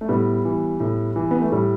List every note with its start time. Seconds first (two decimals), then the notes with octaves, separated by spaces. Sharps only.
0.01 A3
0.09 A2 G3 B3
0.45 E3
0.80 A2
1.16 E3
1.31 B3
1.41 A3
1.52 A2 G3